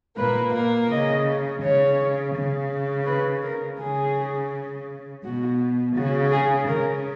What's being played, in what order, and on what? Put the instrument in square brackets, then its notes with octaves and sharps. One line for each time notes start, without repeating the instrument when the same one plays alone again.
[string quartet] A#2 A#3 [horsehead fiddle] B4
[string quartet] A#2 A#3
[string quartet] C#3 [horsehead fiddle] D#5
[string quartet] C#3 [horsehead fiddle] C#5
[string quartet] C#3
[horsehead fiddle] B4
A#4
[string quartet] C#3 [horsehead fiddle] G#4
[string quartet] B2 [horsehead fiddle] F#4
[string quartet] C#3 [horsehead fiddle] F#4
[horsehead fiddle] G#4
[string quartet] C#3 [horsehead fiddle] A#4